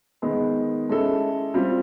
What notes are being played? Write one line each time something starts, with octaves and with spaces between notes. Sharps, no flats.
D#3 G#3 B3
G#3 C#4 E4 A4
G3 C4 F4